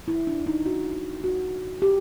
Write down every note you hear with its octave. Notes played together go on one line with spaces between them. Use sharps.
E4
D4
D#4
F#4
F#4
G4